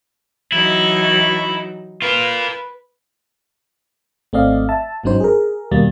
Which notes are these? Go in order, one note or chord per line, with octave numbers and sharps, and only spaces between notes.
E3 F#3 D#4 E4
F4 A#4 B4
G#1 A3 C4 D5 D#5 F5
E5 A5
G1 G#2 F#3 C#4 D#4 C5
G#4 A#4
D#2 B2 G3 A#3 A6